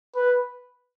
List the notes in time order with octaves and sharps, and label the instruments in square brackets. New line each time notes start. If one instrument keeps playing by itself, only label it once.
[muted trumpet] B4